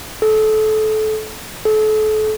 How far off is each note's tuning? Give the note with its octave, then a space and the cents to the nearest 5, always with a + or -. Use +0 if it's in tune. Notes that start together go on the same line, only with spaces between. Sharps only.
A4 -25
A4 -35